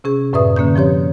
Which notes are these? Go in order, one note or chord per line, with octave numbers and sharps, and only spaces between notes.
C3 C#4 G#4
F#2 A2 B4 D5 E5 D#6
D3 A#3 C#4 G6
F3 C4 G4 C#5